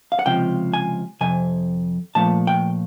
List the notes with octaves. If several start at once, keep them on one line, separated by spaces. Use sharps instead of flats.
F5
F#5
C#2 C3 F3 G5
G#5
F2 C3 G#5
A#2 F3 A3 A5
G5